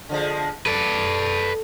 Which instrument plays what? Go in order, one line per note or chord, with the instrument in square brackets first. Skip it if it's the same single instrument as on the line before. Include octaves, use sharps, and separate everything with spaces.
[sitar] D3 F3 G#3
[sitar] A4 [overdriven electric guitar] B4 D5